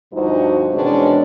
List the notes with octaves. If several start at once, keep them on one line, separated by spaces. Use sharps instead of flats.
D2 G2 F3 D#4 F#4 C5
E2 B2 D#3 G#3 C#4 D4